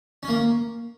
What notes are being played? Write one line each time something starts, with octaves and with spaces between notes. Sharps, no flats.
C#4
A#3